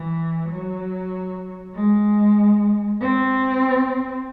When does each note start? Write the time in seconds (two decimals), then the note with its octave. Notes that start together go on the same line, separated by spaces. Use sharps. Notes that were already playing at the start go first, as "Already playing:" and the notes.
Already playing: E3
0.50 F#3
1.75 G#3
3.00 C4